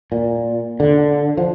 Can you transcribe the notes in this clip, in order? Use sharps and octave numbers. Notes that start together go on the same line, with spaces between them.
A#2
D3
F3